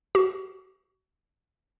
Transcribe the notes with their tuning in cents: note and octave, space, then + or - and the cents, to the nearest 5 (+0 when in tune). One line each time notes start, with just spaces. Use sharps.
F#4 +30